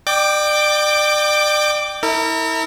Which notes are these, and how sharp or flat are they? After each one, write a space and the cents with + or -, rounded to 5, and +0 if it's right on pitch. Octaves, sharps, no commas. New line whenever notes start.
D5 +35 G5 +0 D6 +0
E4 -30 A#4 -40